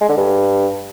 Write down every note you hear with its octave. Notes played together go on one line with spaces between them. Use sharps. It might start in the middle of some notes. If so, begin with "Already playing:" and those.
G#3
D3
G2